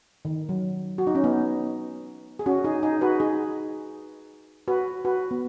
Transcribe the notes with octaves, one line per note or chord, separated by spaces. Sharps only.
D#3
F#3
F#4
D#4
C#4
B3 D#4
G#4
C#4 F#4
D#4 G#4
D#4 G#4
F#4 B4
D#4 G#4
F#4 B4
F#4 B4
B3